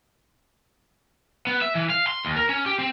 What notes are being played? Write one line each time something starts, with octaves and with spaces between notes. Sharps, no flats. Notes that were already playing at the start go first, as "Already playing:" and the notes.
B3
E5
E3
F5
C6
D#2
A#4
C#4
G4
C4